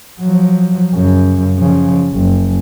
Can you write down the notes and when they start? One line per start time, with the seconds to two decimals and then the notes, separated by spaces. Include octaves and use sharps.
0.20 F3 F#3
0.93 F#2 C#3
1.58 C#3 F3
2.13 F#1